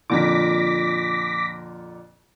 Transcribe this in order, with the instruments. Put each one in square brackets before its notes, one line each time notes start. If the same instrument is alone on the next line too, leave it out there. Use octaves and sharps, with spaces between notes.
[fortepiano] F2 A#2 D3 [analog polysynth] D6 A#6 B6